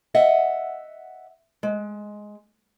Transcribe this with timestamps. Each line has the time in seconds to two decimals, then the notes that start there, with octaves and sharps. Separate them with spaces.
0.14 D#5 E5 F#5
1.63 G#3